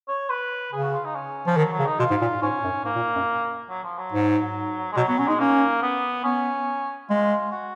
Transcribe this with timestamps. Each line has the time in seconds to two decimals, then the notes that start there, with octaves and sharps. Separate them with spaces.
0.08 C#5
0.30 B4
0.72 C#3 G#4
0.83 F#4
0.93 F4
1.05 D#4
1.15 C#4
1.46 F3
1.57 D#3 F#3
1.72 F#3
1.79 C#3
1.86 D#4
1.99 B2 F4
2.10 G#2
2.21 A#2
2.42 G#2 C#4
2.63 F#2
2.85 G#2 A#3
2.96 A#2
3.16 F#2
3.69 F#3
3.84 F3
3.98 F#3
4.12 G#2
4.92 G#3
4.97 B2 F#3
5.07 F#3 B3
5.19 F#3 C#4
5.28 G#3 D#4
5.39 A#3 C#4
5.82 B3
6.24 B3 C#4
7.09 G#3 F4
7.51 F#4